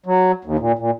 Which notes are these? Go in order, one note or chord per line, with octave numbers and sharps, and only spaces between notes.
F#3
D#2
A#2
A#2